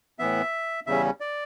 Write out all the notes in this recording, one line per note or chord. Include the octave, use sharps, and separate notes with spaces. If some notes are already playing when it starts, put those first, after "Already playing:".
A2 E3 B3 E5
E2 C#3 G3 C#4 E5
D5